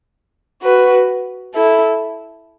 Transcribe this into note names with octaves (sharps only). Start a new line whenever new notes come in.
F#4 B4
E4 A4